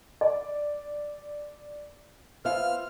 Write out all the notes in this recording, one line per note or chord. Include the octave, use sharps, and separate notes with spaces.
D5
B3 F4 C5 E5 F5 F6